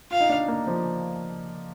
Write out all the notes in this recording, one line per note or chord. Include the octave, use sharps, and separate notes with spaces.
F4 F5
D#4
D4
A#3
F3